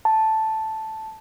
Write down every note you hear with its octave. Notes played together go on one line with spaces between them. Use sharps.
A5